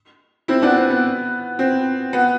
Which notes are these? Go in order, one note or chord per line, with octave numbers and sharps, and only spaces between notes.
C4 E4
B3 D4
C4
B3
C4
B3